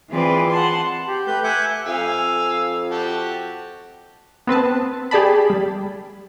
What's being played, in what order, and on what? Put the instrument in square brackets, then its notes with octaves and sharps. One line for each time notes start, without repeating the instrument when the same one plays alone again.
[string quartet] E3 C4 F4 G#4 B4 D5
F#5 A5 C6
[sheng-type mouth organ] G4
A3 B4 G6
E5 F#5 G#5 D6 G6
[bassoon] F2 [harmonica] F5 G#5 E6
[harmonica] F#4 G4 A5
[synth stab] B3 C4 B4 A5
G4 G#4 D5 A5 B5
G3